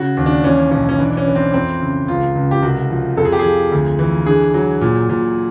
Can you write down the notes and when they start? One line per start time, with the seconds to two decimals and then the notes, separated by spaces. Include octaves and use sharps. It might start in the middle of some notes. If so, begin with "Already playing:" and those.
Already playing: C#3 F#4
0.17 D#2
0.26 D4
0.44 E3 C#4
0.71 B1 C#4
0.89 C#4
0.99 E3 D4
1.17 C#4
1.27 E3
1.35 C4
1.54 F2 C4
1.81 C#3
2.08 C#2 F4
2.35 C#2
2.51 G4
2.62 C2 F#4
2.90 F3
3.17 F2 A4
3.25 G#4
3.32 G4
3.39 G#4
3.44 F3
3.72 D2
3.99 E3
4.26 D3 G#4
4.54 F#3
4.81 A#2
5.09 A#2